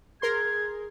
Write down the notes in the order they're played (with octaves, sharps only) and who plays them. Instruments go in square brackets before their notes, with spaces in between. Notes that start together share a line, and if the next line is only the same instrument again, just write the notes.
[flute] G#4 [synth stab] A#4 C6 [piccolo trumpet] G#6